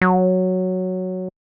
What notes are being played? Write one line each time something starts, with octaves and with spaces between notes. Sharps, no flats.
F#3